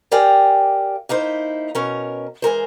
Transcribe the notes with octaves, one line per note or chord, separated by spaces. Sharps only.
G4 A#4 D5 F5 G5 G#5
A#3 D#4 E4 C5
B2 C#4 A#4
E3 G#3 A#4 C5